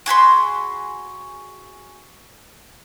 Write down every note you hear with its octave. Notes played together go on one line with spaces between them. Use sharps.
F#4 G#4 B5 C6